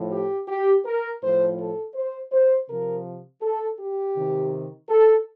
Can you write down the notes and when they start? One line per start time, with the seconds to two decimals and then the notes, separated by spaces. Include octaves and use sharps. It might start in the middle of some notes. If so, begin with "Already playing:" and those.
Already playing: A2 F3
0.12 G4
0.48 G4
0.85 A#4
1.21 A2 F3 C5
1.58 A4
1.95 C5
2.32 C5
2.69 C3 F3 A#4
3.42 A4
3.80 G4
4.15 C3 D#3
4.89 A4